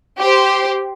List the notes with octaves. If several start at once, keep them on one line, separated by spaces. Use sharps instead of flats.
G4 C5